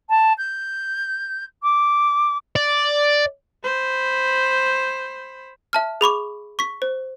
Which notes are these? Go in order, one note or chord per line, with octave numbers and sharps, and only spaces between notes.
A5
G6
D6
D5
C5 B5
E5 A5 F6
G#4 B5 C#6 D6
C#6 B6
C5